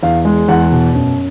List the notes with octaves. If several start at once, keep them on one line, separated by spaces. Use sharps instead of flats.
E2 F5
G#3
E2 F#5
B2
F#2